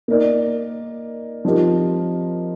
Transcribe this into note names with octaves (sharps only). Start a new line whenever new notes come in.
A#3 D#4 A#4 D5
F3 C4 D#4 G4 A#4